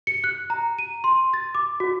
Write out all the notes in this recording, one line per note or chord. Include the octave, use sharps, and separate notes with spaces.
C#7
F#6
A#5
D#7
C6
A6
D6
F#4